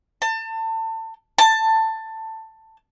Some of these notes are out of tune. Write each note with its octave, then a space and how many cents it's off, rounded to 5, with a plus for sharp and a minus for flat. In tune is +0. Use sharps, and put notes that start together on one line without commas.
A5 +30
A5 +15